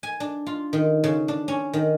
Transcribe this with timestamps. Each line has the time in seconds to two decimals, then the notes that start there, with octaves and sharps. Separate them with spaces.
0.03 G#5
0.20 D4
0.46 F4
0.73 D#3
1.04 C#3
1.28 D4
1.48 C#4
1.73 D#3